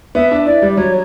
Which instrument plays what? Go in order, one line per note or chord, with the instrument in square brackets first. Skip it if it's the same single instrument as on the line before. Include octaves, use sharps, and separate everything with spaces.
[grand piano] B3 [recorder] E5
[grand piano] D4
[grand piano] E4 [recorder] D5
[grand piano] G3
[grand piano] F#3 [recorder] C#5